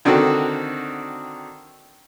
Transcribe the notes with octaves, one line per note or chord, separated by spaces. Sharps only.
D3 D#3 C4 F#4 A4